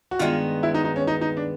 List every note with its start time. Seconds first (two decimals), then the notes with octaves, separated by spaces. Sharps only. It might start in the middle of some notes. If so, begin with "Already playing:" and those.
0.11 F#4
0.19 G2 D#3 G#3 B3 F4
0.63 E4
0.74 D#4
0.85 D#4
0.96 C#4
1.07 D#4
1.21 D#4
1.37 D4